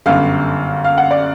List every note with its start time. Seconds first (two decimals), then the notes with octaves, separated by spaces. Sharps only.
0.06 G1 F#2 D3 F5
0.84 F5
0.98 F#5
1.11 D5